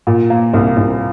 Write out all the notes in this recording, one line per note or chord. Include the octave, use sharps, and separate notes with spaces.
A#2
A#3
C2
C2